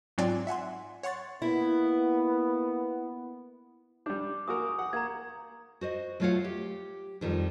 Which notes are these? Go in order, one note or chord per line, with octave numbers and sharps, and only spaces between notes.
G#2 F#3 C4 F4 D5 G#5
E5 F#5 G#5 C6
C#5 F#5 C6 C#6 A6
A#3 B3 E4
G3 D4 D6 G6
A#3 F#4 A#4 G#5 C#6 D#6
F#5
A#3 A#5 G#6
F#4 C5 D#5
F#3 A3 F4 C#5 F5 F#5
G4
F2 D#3 F3 G3